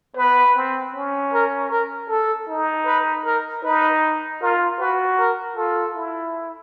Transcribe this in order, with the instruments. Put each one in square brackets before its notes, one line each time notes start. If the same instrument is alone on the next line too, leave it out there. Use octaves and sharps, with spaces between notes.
[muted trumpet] B3 [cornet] B4
[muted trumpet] C4
C#4
[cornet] A#4
A#4
A4
[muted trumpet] D#4
[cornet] B4
A#4
[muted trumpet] D#4 [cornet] B4
[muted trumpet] F4 [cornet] A#4
[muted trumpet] F#4 [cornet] B4
[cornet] A#4
[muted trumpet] F4 [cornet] A4
[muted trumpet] E4